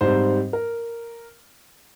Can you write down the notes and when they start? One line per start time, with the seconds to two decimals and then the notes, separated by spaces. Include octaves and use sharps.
0.01 G#2 G3 C4 C5
0.53 A#4